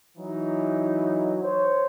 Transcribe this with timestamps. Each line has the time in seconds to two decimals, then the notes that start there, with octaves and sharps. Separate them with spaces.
0.18 E3 F#3 D#4
1.43 C5 C#5